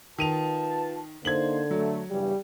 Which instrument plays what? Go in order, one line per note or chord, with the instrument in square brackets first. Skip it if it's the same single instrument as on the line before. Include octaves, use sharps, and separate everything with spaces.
[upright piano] D#3 D#7 F7 [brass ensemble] F4 B4 A5
[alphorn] D3 [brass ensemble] A#3 D#4 C5 [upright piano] G#6 F#7
[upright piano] F#3 [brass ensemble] A3
[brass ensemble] E2 G2 C#3 [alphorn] G3